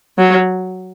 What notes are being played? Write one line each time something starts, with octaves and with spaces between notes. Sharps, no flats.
F#3